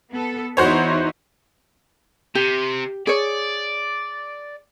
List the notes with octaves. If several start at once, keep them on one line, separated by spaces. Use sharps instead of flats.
B3 A4
E2 D#4 E4 F#4 C5 C#5
C3 G4
G#4 C#5 D5